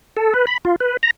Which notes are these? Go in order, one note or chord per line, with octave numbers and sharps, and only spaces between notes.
A4
B4
B5
F4
B4
A#5